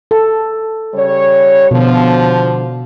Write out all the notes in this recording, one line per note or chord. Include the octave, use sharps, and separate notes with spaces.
A4
C#3 G3 C#5
B2 D3 F3